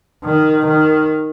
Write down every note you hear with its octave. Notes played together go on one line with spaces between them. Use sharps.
D#3
D#3